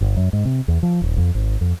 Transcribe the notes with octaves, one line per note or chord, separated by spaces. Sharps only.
G1
F#2
G#2
C3
E2
F3
D#1
F2
G#1
F2